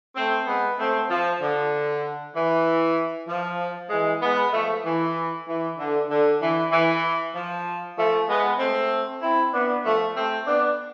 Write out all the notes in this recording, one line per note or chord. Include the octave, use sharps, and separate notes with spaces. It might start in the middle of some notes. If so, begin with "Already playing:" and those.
A3 C4
G#3 B3
A3 C4
F3
D3
E3
F3
E3 G#3
G#3 B3
F3 A3
E3
E3
D3
D3
E3
E3
F3
F3 A3
G#3 B3
A3 C4
C4 E4
B3 D4
F3 A3
A3 C4
B3 D4